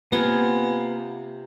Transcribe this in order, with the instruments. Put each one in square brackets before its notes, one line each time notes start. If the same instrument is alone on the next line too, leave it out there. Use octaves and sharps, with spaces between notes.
[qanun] C3 F4 [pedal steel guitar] A#3 G#5 [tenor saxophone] B3